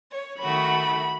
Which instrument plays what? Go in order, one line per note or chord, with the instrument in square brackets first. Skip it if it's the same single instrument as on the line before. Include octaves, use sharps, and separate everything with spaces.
[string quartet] C#5
[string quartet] D#3 A3 F#4 [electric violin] B5